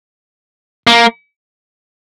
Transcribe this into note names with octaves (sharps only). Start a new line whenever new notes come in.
A#3